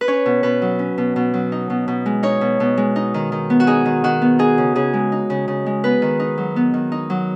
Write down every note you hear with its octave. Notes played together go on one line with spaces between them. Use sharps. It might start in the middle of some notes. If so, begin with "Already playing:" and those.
B4
C#4 C#5
B2
B2 B4
F#3
C#4
B2
B2
F#3
D#4
B2
B2
G#3
D#4 C#5
B2
B2
G#3
D#4
D#3
D#3
B3
F#4
D#4 G#4
D#3
D#3 F#4
B3
D#4 G#4
C#3
C#3 G#4
G#3
D#4
C#3
C#3
G#3
B3 B4
D#3
D#4
F#3
B3
D#3
D#4
F#3